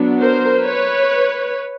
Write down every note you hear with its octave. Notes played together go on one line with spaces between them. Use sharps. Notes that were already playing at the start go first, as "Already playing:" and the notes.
Already playing: F#3 B3 D4
A#4 C5
B4 C#5